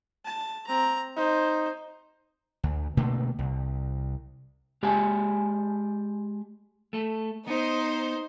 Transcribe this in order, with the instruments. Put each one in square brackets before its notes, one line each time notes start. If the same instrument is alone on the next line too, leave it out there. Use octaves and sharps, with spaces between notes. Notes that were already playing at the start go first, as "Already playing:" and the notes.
[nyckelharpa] A5
C4 A#5
[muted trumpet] D#4 [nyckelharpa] C5
[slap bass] D2
B2 D3 A3 A#3
C2
[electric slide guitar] G#3 G4 G#5 A5
[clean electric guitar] A3 A4
[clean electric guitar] B3 [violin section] D#4 C5